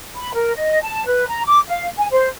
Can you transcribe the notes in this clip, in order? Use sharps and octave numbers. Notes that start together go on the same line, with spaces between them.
B5
A#4
D#5
A5
B4
A#5
D6
F5
G#5
C5